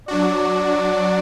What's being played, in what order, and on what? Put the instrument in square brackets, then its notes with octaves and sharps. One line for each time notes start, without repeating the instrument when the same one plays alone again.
[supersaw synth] F#3 D4 F#4 [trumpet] D5